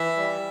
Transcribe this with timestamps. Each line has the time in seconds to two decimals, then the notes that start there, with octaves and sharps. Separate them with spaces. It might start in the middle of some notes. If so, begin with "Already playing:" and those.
Already playing: E3 E5
0.16 G3